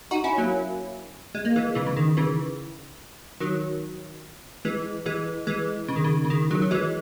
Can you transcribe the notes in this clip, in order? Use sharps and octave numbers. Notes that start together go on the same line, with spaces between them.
D#4 F#4
C#4 E4
F#3 A#3
G#3
A#3
E3 G#3
C#3 E3
C#3
D#3
C#3 E3
D#3 F#3
E3 G#3
E3 G#3
E3 G#3
C#3
D#3
C#3
C#3
D#3
D#3 F#3
F#3
E3 G#3